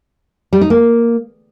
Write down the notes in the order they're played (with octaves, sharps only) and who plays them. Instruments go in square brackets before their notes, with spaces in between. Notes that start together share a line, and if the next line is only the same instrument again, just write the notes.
[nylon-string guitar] G3
D#4
A#3